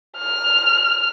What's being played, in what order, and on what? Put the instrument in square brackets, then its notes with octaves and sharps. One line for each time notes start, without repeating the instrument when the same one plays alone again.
[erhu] F6